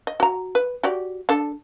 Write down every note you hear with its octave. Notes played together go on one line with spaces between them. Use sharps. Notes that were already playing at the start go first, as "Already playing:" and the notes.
D#5
F#4 A#5
B4
F#4 G4 D5
D4 A4